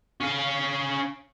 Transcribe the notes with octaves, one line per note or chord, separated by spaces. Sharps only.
C#4 F5